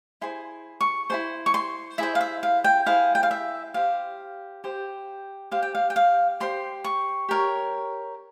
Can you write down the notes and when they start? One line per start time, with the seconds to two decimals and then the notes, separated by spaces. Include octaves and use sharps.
0.21 E4 G#4 C5 C6
0.81 C#6
1.10 E4 G#4 C5 C6
1.46 C#6
1.54 C6
1.98 E4 G#4 C5 E5
2.15 F5
2.21 E5
2.43 F5
2.64 G5
2.86 E4 G#4 C5 F5
3.15 G5
3.23 F5
3.31 E5
3.74 G4 C5 F5
4.64 G4 C5
5.51 G4 C5 F5
5.62 G5
5.75 F5
5.90 G5
5.96 F5
6.40 G4 C5 C6
6.84 C#6
7.29 G4 A#4 C#5